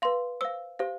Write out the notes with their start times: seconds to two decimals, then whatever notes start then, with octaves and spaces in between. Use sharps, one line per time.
0.02 B4 F5 C6
0.41 C5 F5 E6
0.79 G4 C5 F5